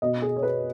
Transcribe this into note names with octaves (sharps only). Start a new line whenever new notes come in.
B2 D#5
G#4
C#5
B4